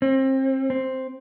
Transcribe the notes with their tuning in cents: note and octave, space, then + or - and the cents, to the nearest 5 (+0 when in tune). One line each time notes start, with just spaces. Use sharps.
C4 +30
C4 +0